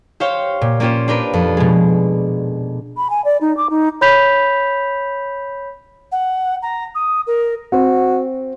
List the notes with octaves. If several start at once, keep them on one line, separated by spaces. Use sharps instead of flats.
G4 C5 C#5 F5 G5
A#2
A#3 C#4 F4 G4 C5
D4 G4 A#4 B4
F2
B2 G#3
B5
G#5
D5
D#4
D6
D#4
C#5 B5 G6 B6 F7
F#5
A#5
D#6
A#4
C4 F#4